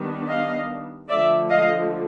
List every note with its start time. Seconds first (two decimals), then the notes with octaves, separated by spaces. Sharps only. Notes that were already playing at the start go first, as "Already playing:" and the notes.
Already playing: D#3 G3 B3 D4
0.27 D#5 F5
1.09 D3 F3 A3 D5 E5
1.50 D#5 F5